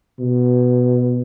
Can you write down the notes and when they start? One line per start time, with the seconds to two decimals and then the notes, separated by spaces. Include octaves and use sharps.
0.20 B2